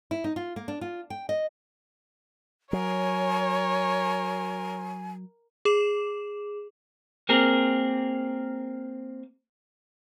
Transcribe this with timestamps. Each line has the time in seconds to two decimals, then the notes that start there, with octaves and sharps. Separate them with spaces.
0.11 E4
0.24 D#4
0.36 F4
0.56 A#3
0.68 D4
0.81 F4
1.10 G5
1.29 D#5
2.73 F#3 A#4 C#5 G#5
5.65 G#4 D6 E7
7.29 A#3 C4 G#4 A#4